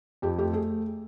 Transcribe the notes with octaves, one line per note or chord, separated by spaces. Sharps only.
F2 G4
A3 G4
A3 G#4